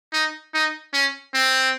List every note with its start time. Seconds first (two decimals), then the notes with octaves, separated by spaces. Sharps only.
0.13 D#4
0.53 D#4
0.93 C#4
1.34 C4